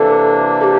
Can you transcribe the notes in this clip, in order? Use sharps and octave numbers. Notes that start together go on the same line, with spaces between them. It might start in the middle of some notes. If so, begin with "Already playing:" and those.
Already playing: C3 E3 A#3 D4 A4
A4
G4